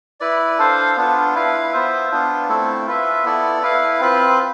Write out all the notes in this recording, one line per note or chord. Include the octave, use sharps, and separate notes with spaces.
E4 B4 D5
D4 A4 C5 F5
B3 D4 F4
E4 B4 F5
B3 F4 C5 E5
B3 D4 F4
A3 C4 E4 A4
F4 B4 E5
B3 E4 A4 D5
E4 B4 F5
C4 F4 B4